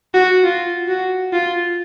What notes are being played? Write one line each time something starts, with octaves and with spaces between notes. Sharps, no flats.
F#4
F4
F#4
F4